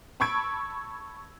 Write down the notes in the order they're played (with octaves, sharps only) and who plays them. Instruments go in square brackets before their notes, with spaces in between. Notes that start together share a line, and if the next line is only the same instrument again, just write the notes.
[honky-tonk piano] A5 B5 C#6 E6 G#6 D7